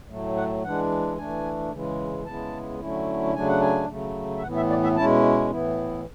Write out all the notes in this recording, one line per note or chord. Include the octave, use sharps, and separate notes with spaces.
A2 F#3 A3
F#5
E3 G#3 D4 F#5
E3 A3 D4 G#5
C#3 E3 G#3
C#3 G#3 B3 E4 A5
D3 F#3 A3 C#4 E4
C#3 F#3 A3 D4 G#5
F#5
G#5
C#3 F#3 A3
E5
A2 E3 B3 F#5
E5
D5
E5
B2 G#3 C#4 E4 A5
A2 E3 B3 E4